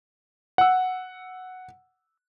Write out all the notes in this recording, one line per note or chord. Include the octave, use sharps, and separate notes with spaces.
F#5 E6